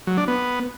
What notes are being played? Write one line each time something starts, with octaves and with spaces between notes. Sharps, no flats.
F#3
D4
B3